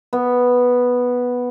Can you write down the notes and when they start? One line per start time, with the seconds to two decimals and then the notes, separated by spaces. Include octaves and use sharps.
0.13 B3